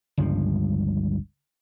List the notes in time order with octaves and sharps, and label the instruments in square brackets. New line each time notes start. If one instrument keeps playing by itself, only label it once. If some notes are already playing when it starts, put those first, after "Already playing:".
[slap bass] G1 C#2 G2 F3